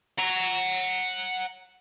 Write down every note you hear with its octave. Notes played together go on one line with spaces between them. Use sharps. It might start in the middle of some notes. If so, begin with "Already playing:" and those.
F#5 A#5